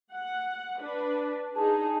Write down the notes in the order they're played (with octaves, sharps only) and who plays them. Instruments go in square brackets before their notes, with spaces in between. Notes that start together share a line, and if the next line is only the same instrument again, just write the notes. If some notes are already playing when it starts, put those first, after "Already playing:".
[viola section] F#5
D4 B4
[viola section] D#4 G#4 [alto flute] A5